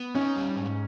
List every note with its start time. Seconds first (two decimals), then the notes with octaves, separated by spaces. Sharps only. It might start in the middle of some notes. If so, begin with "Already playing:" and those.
Already playing: B3
0.15 C#4 D#4
0.36 G3
0.56 G#2